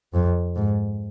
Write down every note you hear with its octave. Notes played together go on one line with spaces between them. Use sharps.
F2
G#2